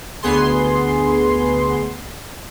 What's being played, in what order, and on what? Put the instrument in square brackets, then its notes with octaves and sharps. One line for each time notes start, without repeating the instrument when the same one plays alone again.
[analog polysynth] D2 B3 G#4 C6